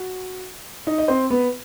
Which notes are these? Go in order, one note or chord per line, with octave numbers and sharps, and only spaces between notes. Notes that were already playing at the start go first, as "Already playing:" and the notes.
Already playing: F#4
D#4 D#5
D#5
C4 C5
B3 B4